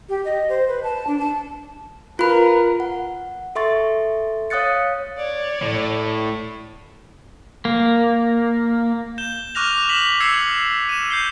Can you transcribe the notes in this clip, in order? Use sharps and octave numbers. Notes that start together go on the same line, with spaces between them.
G4
D#5
C5
B4
A5
D4
A5
F4 A#4 B4 B5
F#5
A4 E5 C6 C#6 A6
C#5 F5 D#6 F#6 A6 C#7
C#5 D5
A2
A#3
G6 E7 G7
C#6 D6 F6 F#6 A#6 F7
B6 E7 F#7
E6 G#6 C7 C#7
D#7 E7
G6 C7 G7